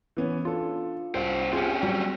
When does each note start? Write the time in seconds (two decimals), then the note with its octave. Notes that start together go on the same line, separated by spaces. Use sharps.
0.17 E3 B3 C#4
0.45 D4 F4 A4
1.15 C2 C#4 C5
1.53 C4 C#4 F4 G4 G#4
1.83 F#3 G3 F#4